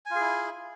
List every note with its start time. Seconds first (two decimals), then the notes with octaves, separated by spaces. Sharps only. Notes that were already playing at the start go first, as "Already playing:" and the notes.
0.06 G#5
0.11 F4
0.15 G#4
0.20 E4